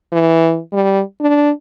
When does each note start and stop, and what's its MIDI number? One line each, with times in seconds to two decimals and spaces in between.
0.12 0.59 52
0.72 1.01 55
1.20 1.51 62